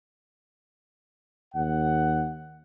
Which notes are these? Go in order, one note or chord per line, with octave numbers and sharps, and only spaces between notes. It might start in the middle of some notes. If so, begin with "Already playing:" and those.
D#2 F#5